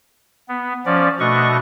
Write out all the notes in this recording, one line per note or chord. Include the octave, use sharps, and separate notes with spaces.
B3
F3 C#4 D5
B2 A3 D4 D#5 C#6